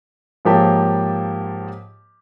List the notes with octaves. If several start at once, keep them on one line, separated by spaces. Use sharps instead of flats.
G#2 F3 A#3 G4 C#5 A5